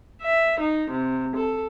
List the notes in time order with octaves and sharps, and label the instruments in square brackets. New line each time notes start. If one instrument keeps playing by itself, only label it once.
[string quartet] E5
D#4
C3
A4